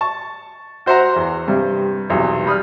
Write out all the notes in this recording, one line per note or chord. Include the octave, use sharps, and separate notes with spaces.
A5 C#6
F#4 C5 E5 F#5 A#5
E2
G2 C3
B1 E2 C3
G3 B5 D#6 F6